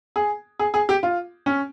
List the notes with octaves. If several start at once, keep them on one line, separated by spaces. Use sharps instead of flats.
G#4
G#4
G#4
G4
F4
C#4